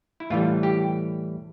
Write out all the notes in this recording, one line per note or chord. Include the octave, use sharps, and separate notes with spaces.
E4
A2 E3 G3 F4
G4